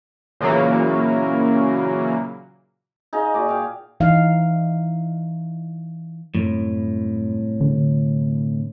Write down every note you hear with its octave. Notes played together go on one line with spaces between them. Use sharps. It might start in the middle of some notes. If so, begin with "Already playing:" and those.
A#2 C#3 E3 F#3 A#3
D#4 G#4 D#5 F5
A#2 F#4 D5
F5 G5
E3 D#4 F5
C2 F#2 A2
D3